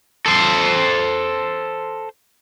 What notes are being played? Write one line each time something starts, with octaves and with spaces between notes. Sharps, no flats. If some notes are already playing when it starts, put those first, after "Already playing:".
A4 C5